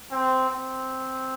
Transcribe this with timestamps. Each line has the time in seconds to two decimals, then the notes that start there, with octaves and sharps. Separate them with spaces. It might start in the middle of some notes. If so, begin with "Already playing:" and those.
0.11 C4
0.50 C4